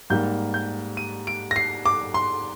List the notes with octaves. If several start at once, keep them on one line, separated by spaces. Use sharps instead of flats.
G#2 G3 A#3 G6
G6
D#7
D7
A#6
C7
D6
C6